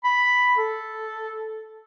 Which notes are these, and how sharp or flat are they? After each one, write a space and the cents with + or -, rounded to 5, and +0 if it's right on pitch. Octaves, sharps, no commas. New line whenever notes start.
B5 +0
A4 -5